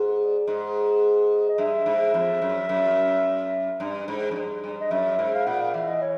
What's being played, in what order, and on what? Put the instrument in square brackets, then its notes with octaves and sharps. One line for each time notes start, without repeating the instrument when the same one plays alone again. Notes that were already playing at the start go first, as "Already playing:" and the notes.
Already playing: [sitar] G#2
[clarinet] D5
[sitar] G#2 [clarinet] D#5
[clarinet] D#5
[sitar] G2 [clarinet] E5
[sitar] G#2
F2
F#2
F#2
G2
G#2
F#2
G2
G2
[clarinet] D#5
[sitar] F#2 [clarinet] E5
[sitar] G#2
[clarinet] F5
[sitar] A#2 [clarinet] F#5
[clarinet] F5
[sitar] E3 [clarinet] E5
[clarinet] D#5
C#5